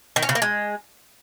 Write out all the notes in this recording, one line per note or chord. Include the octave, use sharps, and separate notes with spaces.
D#3
C#4
C#3
A#3
G#3